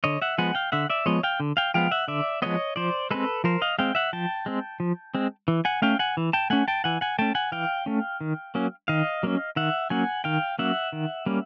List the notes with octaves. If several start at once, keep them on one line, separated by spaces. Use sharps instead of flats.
D3 C#5 D#5
E5 F#5
F3 G#3 B3 F#5 G#5
F5 G5
D3 E5 F#5
D5 E5
F3 G#3 B3 C#5 D#5
F5 G5
D3
F5 G5
F3 G#3 B3 F5 G5
E5 F#5
D3 D5 E5
F3 G#3 B3 C#5 D#5
F3 C5 D5
G#3 C4 A4 B4
F3 A#4 C5
D#5 F5
G#3 C4 F5 G5
E5 F#5
F3 G5 A5
G#3 C4
F3
G#3 C4
E3
F#5 G#5
A3 C#4 F5 G5
F#5 G#5
E3
G5 A5
A3 C#4 F#5 G#5
G5 A5
E3 F#5 G#5
F#5 G#5
A3 C#4 G5 A5
F#5 G#5
E3 F5 G5
A3 C#4
D#3
F#3 A#3 C#4
D#3 D#5 F5
F#3 A#3 C#4
D#3 E5 F#5
F#3 A#3 C#4 F#5 G#5
D#3 F5 G5
F#3 A#3 C#4 E5 F#5
D#3
G3 A#3 C#4